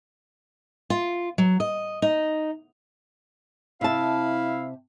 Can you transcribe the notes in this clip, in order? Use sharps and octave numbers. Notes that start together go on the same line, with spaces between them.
F4
F#3
D#5
D#4
C3 E4 E5 F5 A5